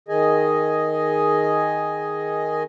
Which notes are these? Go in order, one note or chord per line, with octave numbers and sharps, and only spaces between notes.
D#3 G#4 D#5 G#5